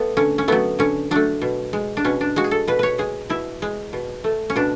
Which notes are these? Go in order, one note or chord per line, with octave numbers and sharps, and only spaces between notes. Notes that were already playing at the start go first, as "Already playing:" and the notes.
Already playing: A3 B3
D3 C#4
C#4
F#3 A3 B3
D3 C#4
F#3 A3 D4
B2
G#3
D4
B2 C#4
D4
G#3 F#4
G#4
A4
B2 B4
B4 C#5
G#3 G#4
B2 E4
G#3
B2
A3
C#4
B2 D4